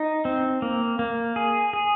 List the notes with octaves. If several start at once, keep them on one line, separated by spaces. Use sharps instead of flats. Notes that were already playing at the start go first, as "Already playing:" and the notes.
Already playing: D#4
C4
A#3
A#3
G#4
G#4